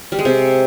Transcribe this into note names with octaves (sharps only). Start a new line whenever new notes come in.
G3
G#3
C3